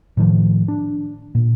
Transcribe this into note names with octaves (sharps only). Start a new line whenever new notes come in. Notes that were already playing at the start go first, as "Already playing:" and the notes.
A2 D#3 F3
D4
A#2